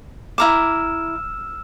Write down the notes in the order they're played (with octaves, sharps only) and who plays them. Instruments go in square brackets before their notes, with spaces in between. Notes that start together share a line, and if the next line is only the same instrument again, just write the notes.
[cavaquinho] E4 A#5 D6 [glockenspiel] E6 F6 E7